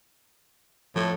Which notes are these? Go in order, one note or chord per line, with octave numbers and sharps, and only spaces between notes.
A2 F3 A4